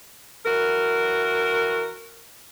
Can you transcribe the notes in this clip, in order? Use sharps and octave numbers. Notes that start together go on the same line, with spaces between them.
E3 F#4 A#4